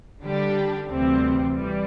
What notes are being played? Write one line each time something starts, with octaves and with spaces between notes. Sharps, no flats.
D3 G3 D4 G4
D2 C3 E3 G3 C4
E3 G3